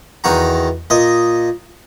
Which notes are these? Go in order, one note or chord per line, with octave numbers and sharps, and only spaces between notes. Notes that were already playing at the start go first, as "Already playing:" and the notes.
E2 D#3 F#4 A#5
A#2 D#5